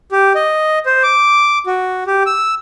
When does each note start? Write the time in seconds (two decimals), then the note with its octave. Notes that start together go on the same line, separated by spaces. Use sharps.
0.12 G4
0.35 D#5
0.86 C5
1.03 D6
1.66 F#4
2.07 G4
2.26 E6